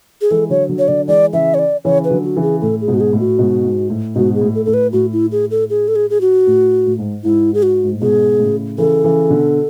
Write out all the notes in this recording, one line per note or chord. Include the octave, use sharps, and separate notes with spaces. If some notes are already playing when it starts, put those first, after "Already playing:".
G#4
E3 G#3 A4
D3 F#3 C#5
D3 F#3
C#5
D3 F#3 D5
E3 G#3 D5
C#3 E3 E5
C#5
D5
C#3 E3 C#5
B4
D3 F#3
F#4
C#3 E3
G#4
A2 A4
G#4
G#2 B2
F#4
G#4
A2
F#4
G#2 B2
G#2
A2
G#2 B2 F#4
G#4
A2
A4
A2 A4
B4
A2 F#4
E4
G#4
A4
G#4
A4
G#4
G#4
F#4
A2
A2
G#2
G#2 E4
G#4
F#4
G#2
A2
G#2 B2 G#4
A2 C#3
C#3 E3 A4
C#3 E3
B2 D3